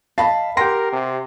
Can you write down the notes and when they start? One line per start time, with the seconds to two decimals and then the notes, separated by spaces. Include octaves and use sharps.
0.18 D#5 F5 A5 B5
0.57 G4 A#4 F#5 G5 C6 A#6
0.92 C3